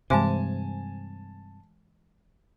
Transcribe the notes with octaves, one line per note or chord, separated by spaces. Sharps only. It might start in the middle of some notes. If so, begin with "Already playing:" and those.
G2 C3 E3 G#3 G#5 A5 D6